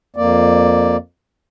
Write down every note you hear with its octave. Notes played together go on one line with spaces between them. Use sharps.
F2 A#3 D5